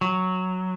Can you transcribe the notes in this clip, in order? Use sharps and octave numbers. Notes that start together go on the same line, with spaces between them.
F#3